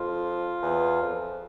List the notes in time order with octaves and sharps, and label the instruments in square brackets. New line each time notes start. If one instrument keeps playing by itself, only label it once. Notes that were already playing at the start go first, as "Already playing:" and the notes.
Already playing: [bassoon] F2 [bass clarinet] F4
[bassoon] E2
F2